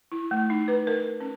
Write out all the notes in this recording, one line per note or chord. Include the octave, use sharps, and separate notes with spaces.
E4
A3
D#4
B4
A#4
C#4